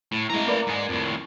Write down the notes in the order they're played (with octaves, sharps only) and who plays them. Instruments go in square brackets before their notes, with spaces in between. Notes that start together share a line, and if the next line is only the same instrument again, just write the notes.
[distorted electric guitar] A2
[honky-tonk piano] E3 G#3 [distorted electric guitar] A3 A#5
[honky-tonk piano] A#3 B4 D5
[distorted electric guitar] G#2 G#3
F2 A2